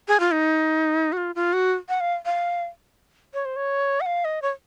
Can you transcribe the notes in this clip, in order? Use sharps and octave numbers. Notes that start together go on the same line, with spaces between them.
G#4
F4
D#4
F#4
F4
F4
F#4
F#5
F5
F5
C#5
C5
C#5
F#5
F5
D#5
C#5